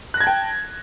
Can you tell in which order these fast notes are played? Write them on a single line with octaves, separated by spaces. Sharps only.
F#6 A#6 G#6 A5 G5